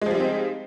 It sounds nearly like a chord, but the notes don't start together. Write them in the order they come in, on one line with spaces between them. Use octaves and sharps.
G#3 F3 G3 D#4 C4